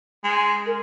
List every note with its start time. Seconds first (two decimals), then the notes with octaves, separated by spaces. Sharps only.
0.24 G#3
0.67 A#4